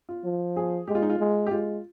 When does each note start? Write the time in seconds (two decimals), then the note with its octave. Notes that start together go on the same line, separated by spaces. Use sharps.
0.09 F4
0.24 F3
0.57 G#4
0.88 G#3 G4
0.95 F4
1.02 D#4
1.10 F4
1.19 G#3
1.47 G4
1.51 G#3 F4